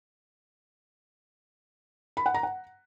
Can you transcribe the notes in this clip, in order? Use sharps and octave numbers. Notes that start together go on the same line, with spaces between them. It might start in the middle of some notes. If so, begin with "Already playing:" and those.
B5
F#5
A#5
F#5